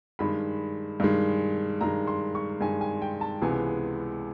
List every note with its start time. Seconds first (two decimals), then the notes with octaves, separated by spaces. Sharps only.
0.19 G2 D#3 G#3 B5
1.00 G2 D#3 G#3
1.81 G2 D#3 G#3 A#5
2.07 C6
2.35 C#6
2.61 G2 D#3 G#3 G#5
2.81 G#5
3.02 G5
3.21 A5
3.42 C#2 C3 E3 G#3 B3 G#5